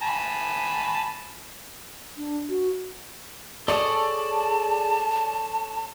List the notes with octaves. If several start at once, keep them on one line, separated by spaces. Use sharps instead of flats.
G#5 A5 B5
D4
F#4
G#4 A4 C#5 D5 A5 D#6